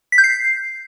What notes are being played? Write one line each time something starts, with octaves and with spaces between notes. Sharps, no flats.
B6
G6
C7